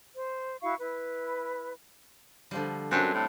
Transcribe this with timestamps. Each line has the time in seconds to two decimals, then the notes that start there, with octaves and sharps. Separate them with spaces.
0.15 C5
0.62 E4 F#4 F5 C#6
0.80 E4 B4
2.51 D3 F3 G3
2.91 F#2 C4 D4
3.14 A2